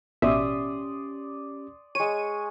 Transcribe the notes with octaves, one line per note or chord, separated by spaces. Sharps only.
A1 B2 C#4 G4 D5 E5 C6 D#6
G#3 C#5 D#7